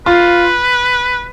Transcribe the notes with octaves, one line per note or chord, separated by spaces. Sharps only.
F4 B4